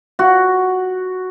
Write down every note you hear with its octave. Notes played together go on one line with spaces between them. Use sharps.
F#4